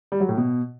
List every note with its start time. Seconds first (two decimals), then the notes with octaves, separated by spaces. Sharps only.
0.12 G3
0.20 F#3
0.29 A2
0.37 B2